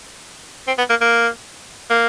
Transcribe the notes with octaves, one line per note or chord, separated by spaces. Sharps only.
C4
B3
A#3
A#3
A#3